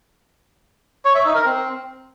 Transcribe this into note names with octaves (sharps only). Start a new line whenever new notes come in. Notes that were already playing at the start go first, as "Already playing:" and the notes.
C#5
E5
D#4
A#4
C4